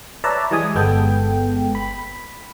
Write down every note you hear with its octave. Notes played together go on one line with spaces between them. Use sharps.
B4 C#5 D5 E5 A5 A#5
E3 G3 G#3 G#5 D#6
G1 G#3 B3 A4 G5
B5